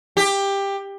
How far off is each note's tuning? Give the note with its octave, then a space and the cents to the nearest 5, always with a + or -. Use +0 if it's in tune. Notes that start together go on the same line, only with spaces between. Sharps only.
G4 +15